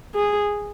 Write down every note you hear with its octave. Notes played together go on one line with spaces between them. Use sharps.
G#4